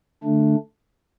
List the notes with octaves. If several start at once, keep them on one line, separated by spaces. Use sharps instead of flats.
D3 A3 D4